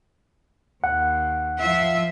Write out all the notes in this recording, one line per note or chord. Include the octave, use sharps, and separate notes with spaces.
D#2 F#5
F3 F4 E5